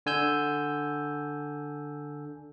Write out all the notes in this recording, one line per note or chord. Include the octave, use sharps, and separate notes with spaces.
D3 G#5 E6 G6